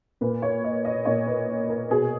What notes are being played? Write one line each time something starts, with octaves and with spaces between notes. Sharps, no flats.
A#2 B4
C#5
D#5
D#5
A#2 C#5
B4
A#4
B2 G#4